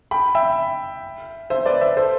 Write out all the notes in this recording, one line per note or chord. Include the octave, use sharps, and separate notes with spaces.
G5 B5
E5 G5
C5 E5
B4 D5
C5 E5
A4 C5